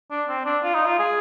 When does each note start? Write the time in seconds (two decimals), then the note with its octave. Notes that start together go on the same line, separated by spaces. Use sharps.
0.11 D4
0.29 C4
0.46 D4
0.64 F4
0.75 D#4
0.85 F4
0.99 G#4